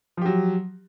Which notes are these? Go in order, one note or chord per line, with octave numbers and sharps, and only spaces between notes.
F3 F#3 G4